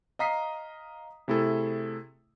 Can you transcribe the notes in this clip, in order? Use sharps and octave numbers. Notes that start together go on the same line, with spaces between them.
D#5 F5 A#5 D#6 B6 C7
C3 A3 E4 G#4 A4